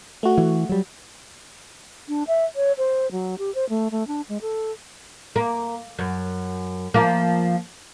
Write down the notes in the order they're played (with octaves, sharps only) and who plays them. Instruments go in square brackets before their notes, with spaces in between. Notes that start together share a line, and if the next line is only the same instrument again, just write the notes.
[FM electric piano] A3 F#4
[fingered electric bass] E3
F#3 G3
[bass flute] D4
E5
C#5
C5
F#3
G4
C5
A3
A3
D4
G#3
A4
[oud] A#3
F#2
F3 A#3